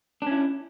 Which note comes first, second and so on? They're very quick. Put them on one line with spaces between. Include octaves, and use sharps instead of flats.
D4 C#4 E4